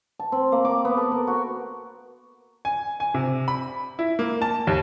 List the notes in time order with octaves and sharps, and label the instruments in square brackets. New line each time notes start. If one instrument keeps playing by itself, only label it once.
[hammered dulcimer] A5
C4
A#3
D6
B3
A4
A#4
F#4
[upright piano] G#5
G#5
C3
B5
E4
A#3
A5
D#2